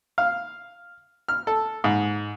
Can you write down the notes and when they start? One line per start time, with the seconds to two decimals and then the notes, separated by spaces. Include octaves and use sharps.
0.18 F5
1.28 F6
1.47 A4
1.84 G#2